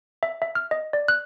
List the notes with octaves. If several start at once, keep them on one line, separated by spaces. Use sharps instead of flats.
E5
E5
F6
D#5
D5
F#6